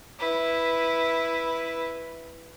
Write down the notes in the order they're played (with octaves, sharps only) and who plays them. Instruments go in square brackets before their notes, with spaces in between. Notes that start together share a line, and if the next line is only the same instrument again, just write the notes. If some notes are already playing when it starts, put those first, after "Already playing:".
[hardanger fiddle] E4 B4